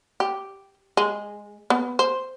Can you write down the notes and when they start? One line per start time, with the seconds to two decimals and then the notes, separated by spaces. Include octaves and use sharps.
0.20 G4
0.97 G#3
1.70 B3
1.99 C5